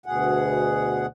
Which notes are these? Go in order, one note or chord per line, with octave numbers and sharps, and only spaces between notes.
D2 B2 G#4 F#5